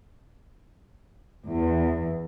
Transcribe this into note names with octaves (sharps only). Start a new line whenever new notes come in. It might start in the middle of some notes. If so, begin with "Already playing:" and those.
E2